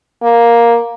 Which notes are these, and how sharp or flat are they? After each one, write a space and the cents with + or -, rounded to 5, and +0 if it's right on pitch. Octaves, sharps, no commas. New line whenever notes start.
A#3 +5